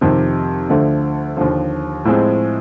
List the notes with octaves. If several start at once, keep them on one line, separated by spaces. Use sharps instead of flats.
F2 C3 D#3
D2 D3 F3 A3
D#2 D3 F3
A2 F3 G#3 C4